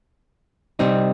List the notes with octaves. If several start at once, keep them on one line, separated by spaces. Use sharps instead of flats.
C3 G3 C4 D#4